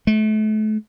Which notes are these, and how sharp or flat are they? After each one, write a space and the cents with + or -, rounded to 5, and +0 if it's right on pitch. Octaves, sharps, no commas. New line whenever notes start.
A3 -35